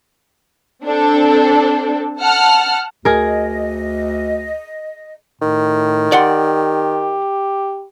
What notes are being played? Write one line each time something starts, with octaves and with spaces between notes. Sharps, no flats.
C4 D4 A4
F#5 A5 F6
D2 G#4 A#4 D#5
A2 D#3
G4 D5 F#5 C6